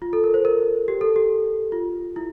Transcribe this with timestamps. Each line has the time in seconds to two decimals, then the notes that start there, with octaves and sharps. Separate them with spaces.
0.02 F4
0.13 A4
0.24 A#4
0.34 C5
0.45 A#4
0.88 G4
1.01 A4
1.16 G4
1.72 F4
2.16 E4